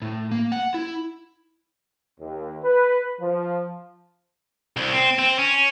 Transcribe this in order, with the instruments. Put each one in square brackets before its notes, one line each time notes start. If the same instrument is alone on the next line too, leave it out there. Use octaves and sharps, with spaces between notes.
[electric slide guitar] A2
A#3
F#5
E4
[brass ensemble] D#2
B4
F3
[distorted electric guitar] C2
C4
C4
C#4